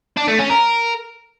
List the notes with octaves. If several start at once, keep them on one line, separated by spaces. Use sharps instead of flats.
D4
A3
C#4
A#4